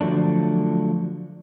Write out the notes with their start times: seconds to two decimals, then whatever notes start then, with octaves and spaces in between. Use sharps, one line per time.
0.01 D3 F3 F#3 A3 D4